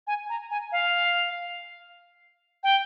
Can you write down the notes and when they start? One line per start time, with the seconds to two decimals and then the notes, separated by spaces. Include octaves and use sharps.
0.07 G#5
0.29 A#5
0.51 G#5
0.72 F5
2.64 G5